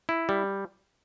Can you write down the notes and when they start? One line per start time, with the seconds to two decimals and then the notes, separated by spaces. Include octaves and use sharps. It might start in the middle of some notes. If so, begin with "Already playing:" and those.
0.09 E4
0.29 G3